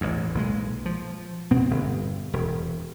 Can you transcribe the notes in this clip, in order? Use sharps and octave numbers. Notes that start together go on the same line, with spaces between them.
A1 E2
B1 A#2 F#3 G#3
F3
B2 B3 C4
G1
E1